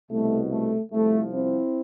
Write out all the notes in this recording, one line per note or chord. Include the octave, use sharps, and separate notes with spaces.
C2 B2 A3
A3
C2 C3 F3 A3
C4 E4